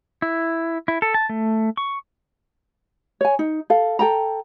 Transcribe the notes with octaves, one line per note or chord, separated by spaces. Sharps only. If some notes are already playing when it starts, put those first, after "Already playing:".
E4
E4
A4
A5
A3
C#6
C#5 G#5
D#4
A4 F5
A4 G5 A#5